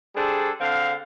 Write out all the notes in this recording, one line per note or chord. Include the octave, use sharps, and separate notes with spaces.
G3 D4 G#4 A4 C5
D3 C4 F5